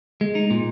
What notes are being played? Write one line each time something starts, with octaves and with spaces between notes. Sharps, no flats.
G#3
D#4
A#2